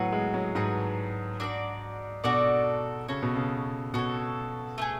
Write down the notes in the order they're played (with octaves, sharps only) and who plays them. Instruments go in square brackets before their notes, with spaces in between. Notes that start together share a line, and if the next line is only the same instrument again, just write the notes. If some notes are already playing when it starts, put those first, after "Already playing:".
Already playing: [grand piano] A2 F#3 [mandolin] B3 F#4 B4
[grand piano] G#3
F#3
[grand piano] G#2 [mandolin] B3 D4 F#4 B4
[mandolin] D4 F#4 A4 D5
[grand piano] B2 [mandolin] D4 F#4 A4 D5
[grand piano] C#3 [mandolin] F#4 A4 C#5
[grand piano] B2
C#3
[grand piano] B2 [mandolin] F#4 A4 C#5
[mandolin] A3 D4 G#4